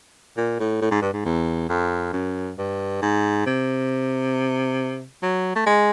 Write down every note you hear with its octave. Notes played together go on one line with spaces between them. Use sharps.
A#2
A2
A2
G#2
G2
G#2
E2
F2
F#2
G2
G#2
C3
F#3
A3
G#3